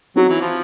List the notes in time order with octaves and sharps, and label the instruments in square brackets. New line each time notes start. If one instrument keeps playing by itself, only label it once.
[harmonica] F#3 [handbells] C4 D#4 F#4
[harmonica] E3
F3